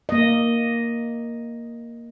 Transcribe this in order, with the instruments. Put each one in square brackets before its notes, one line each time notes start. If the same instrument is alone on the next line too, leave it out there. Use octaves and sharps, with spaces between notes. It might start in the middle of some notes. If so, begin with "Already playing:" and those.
[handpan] A#3 D#5